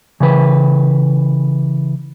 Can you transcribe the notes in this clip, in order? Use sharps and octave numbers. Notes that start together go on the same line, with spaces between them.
C#3 E3 B4